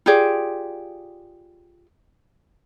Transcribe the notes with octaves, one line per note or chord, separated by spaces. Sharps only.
F4 G4 G#4 D5